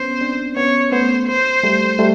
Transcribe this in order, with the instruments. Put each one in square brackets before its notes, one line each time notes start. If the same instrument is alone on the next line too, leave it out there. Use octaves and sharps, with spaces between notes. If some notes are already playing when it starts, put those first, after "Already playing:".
Already playing: [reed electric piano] B3 C#4 [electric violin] C5
[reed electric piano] C4 D4
[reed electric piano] B3 C#4 [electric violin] C#5
[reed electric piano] A3 B3 [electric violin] C5
[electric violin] C5
[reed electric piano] G3 A3
G3 A3